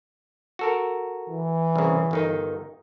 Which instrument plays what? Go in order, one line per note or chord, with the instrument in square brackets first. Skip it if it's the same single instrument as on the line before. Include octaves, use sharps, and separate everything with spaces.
[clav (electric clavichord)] F#4 A4 A#4
[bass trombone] E3
[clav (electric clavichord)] C2 C#3
G1 D#3 D#4